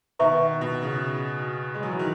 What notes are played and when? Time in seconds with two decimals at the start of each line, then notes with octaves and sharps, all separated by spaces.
0.19 B2 D#3 B4 E5 A#5 C#6
0.61 B2
0.82 C#3
1.74 G#3
1.83 F#3
1.91 E3
1.99 D#3